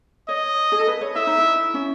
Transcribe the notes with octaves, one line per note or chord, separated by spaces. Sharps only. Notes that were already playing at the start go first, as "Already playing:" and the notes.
C#5 D#5
G#4
A4
B4
C#5
E4 E5
D#4
E4
C#4